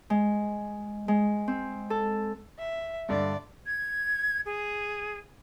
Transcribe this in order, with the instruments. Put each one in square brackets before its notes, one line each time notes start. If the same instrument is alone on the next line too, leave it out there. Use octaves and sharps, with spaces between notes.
[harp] G#3
G#3
C4
A4
[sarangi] E5
[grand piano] G2 D3 [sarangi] D5
[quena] G#6
G#4